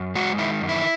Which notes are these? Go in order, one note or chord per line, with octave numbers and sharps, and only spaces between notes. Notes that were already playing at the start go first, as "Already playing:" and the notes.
Already playing: F#2
G#3 F#4
D#3 E4
F#2
E4